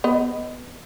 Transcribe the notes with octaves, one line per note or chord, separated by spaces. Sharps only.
B3 D#5